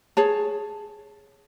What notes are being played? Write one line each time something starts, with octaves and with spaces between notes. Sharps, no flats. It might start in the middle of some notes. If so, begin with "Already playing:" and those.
G#4 C#5 A5